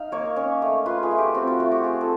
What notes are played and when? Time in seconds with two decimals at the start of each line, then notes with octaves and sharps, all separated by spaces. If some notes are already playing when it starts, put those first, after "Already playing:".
Already playing: D#4 F5
0.12 A#3 C#5
0.36 C#4
0.62 A3
0.86 F4 B4
1.03 G#4
1.11 A3
1.18 G4
1.35 C4 F#4
1.47 F4
1.59 A3 F#4
1.72 G4
1.83 F4 G#4
2.01 A4